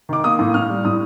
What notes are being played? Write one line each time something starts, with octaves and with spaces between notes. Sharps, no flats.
D#3 D6
A#3 D#6
A2
A2 F6
G3
A2 D#6